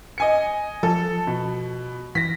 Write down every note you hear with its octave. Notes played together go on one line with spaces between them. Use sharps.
D#5 G#5 C#7
F3 A4
B2
E3 A#6 B6